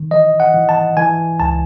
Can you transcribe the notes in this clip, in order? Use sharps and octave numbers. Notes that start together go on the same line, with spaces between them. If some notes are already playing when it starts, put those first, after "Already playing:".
Already playing: D#3
E3 D#5
F#5
E3
A5
E3 G#5
C#2 A5